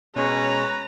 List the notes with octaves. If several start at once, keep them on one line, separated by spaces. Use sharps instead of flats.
B2 G#3 C#4 B4 C#5 A#5